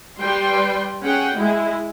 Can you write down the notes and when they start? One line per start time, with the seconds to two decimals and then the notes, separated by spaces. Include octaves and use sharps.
0.19 G3 B4 G5 C6
1.02 C#4 G#4 F#5 G5
1.35 G#3 E4